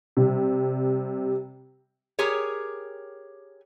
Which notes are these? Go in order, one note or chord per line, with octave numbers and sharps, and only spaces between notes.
C3 G3
G4 G#4 A#4 C#5